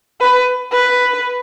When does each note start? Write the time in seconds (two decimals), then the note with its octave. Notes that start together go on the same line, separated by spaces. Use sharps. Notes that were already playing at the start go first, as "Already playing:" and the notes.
0.21 B4
0.72 B4